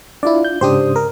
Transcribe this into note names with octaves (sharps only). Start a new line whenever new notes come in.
D4 E4 F4 D5
G6
G#2 C#3 D4 G4 C5 D#6
A#4